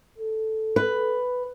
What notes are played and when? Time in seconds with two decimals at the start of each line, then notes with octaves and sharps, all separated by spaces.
0.18 A4
0.76 B4